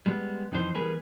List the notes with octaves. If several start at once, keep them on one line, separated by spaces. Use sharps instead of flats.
G3 G#3 B3
F2 E3 D#4 F4 C5
E3 G3 B3 G#4 A#4 B4